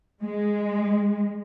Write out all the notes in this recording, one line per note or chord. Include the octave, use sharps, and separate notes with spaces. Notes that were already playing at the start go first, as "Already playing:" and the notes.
G#3